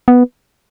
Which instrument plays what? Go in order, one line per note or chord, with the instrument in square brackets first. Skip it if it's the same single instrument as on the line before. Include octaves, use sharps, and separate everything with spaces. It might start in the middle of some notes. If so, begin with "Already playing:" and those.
[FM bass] B3